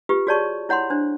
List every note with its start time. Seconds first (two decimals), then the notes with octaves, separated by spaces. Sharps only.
0.09 F4 G4 B4
0.27 F#4 G#4 C#5 D5 A5 C#6
0.69 E4 C#5 F#5 B5 C6
0.90 D4 C5